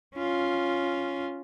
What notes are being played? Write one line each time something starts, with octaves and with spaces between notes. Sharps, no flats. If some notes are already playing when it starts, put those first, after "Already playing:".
C#4 F4